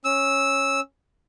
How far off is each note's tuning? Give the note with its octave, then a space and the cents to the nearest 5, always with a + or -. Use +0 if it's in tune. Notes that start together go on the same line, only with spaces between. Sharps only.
C#4 -10 E6 -10